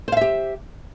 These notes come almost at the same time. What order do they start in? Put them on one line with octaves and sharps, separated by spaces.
C5 F5 E5 G4